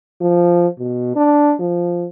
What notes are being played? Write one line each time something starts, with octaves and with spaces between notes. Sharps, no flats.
F3
B2
D4
F3